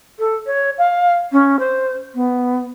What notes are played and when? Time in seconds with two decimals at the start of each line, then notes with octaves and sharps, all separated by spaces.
0.19 A4
0.46 C#5
0.78 F5
1.32 C#4
1.59 C5
2.15 B3